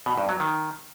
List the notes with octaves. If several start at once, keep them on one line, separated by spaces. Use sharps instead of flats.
B2
G2
F#3
D#3